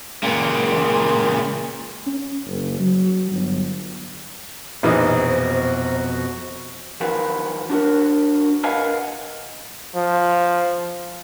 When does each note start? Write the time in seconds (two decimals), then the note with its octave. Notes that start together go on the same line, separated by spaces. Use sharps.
0.23 C#2 A#2
2.07 C#4
2.46 F#1
2.79 F#3
3.32 G1
4.83 A#1 F2 B2 E3 D#4 F#4 C5
7.01 D#3 F3 F#3 F#4 A#4 B4
7.70 D4 F#4 A#4
8.64 A#4 B4 D#5 F5 F#5 G#5
9.95 F3